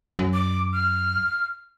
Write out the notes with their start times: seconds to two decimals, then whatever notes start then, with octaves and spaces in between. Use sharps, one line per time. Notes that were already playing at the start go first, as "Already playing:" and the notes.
0.19 F#2
0.34 D6
0.73 F6